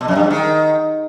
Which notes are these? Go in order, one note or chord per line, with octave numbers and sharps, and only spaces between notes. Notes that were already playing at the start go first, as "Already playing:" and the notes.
B2
F#2
G2
G#2
D#3